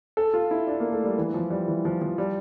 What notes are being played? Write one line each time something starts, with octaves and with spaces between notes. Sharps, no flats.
A4
F4
E4
D4
A#3
A3
G3
E3
F3
G3
E3
F3
F3
G3